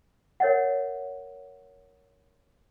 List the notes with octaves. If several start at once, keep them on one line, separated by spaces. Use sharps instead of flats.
A#4 C#5 D#5 E5 F#5